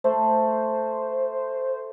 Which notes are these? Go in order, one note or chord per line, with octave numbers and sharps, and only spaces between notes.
A3 C5